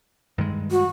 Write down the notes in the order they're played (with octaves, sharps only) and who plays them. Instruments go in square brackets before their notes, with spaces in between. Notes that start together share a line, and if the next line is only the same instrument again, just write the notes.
[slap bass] G2 D#3 G#3
[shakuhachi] F#4